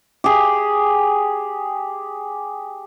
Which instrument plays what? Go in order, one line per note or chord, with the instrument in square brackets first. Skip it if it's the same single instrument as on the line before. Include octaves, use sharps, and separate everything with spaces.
[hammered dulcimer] G4 G#4